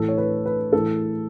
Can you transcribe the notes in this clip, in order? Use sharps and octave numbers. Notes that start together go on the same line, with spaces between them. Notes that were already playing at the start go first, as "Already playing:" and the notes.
Already playing: A2 E3 A4
C#5
B4
B4
A2 E3 A4